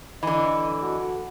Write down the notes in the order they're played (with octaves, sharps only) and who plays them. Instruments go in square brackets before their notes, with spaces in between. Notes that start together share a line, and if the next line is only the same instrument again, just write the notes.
[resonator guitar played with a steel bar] D3 E3 [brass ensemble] D#5
[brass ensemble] A3 F#4 A4